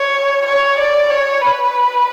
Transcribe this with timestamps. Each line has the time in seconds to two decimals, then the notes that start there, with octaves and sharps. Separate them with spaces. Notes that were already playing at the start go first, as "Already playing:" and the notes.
Already playing: C#5
0.47 C#5
0.79 D5
1.10 C#5
1.41 B4